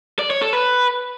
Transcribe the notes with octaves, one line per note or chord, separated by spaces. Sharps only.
D5
C#5
A4
B4